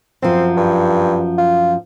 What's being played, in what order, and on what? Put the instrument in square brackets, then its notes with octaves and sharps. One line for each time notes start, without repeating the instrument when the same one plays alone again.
[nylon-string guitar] F#2 F3 [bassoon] C4
[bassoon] G2
F4